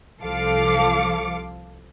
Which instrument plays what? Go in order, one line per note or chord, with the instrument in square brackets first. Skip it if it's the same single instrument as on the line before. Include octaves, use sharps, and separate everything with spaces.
[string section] C2 F3 A4 F5 D6 C#7